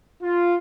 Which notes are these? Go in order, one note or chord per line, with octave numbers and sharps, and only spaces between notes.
F4